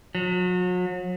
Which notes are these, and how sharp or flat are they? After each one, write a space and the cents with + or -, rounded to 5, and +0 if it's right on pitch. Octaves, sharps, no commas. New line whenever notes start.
F#3 -40